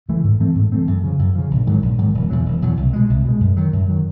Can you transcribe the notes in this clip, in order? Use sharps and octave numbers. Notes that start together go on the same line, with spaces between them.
C#3 E3 A3
G#2
E3 A3 C4
G#2
E3 A3 C4
F#2
C#3 F3
F#2
C#3 F3
A#1
G#2 D#3 F#3
A#1
G#2 D#3 F#3
E1
E2 B2 F#3
E1
E2 B2 F#3
C2
B2 G#3
C2
B2 G#3
F#2
D#3 F#3
F#2
D#3 F#3